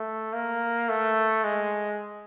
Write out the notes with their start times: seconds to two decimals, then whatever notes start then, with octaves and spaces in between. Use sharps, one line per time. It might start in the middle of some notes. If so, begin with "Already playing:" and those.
Already playing: A3
0.33 A#3
0.89 A3
1.44 G#3